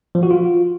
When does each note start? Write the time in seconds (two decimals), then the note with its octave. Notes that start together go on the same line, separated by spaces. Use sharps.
0.15 F3
0.23 F#4
0.31 F4